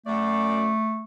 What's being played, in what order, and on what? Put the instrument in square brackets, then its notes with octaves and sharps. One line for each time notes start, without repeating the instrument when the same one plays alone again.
[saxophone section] F#2 D5 [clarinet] A3